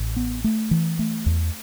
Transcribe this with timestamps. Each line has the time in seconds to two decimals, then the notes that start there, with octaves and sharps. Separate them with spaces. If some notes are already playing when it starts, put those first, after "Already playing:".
Already playing: A1
0.16 B3
0.44 A3
0.71 E3
0.99 A3
1.26 E2